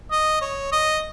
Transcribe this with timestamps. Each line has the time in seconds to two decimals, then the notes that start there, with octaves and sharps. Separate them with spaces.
0.11 D#5
0.41 C#5
0.72 D#5